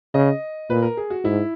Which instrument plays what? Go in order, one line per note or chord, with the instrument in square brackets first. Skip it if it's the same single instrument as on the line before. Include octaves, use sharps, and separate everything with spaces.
[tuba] C#3 [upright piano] D#5
[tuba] A#2 [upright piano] B4
[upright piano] A#4
G#4
F#4
[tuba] G#2 [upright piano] E4